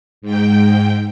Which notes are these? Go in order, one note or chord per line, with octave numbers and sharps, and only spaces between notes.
G#2 G5